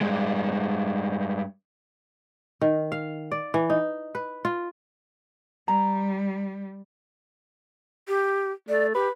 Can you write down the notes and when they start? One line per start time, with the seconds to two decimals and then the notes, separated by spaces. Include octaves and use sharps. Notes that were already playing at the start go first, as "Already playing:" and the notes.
0.01 G2 G#3
2.61 D#3
2.92 F5
3.31 D5
3.54 E3
3.70 D#4
4.15 B4
4.45 F4
5.68 G3 A#5
8.08 G4
8.69 A3 D5
8.95 G4 B4